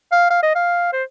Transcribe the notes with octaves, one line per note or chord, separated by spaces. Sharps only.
F5
F5
D#5
F5
C5